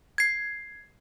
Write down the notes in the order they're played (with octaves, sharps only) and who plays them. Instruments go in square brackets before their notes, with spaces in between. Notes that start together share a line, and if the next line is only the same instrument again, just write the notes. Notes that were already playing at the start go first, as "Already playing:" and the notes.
[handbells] G#6 C7